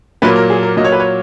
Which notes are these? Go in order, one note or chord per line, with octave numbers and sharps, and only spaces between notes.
A#2 F#3 A#3 B4
A#4
G#4
A#4
A#2 F#3 A#3 D#5
C#5
B4
C#5